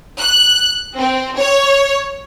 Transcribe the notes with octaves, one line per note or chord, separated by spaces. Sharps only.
F#6
C4
C#5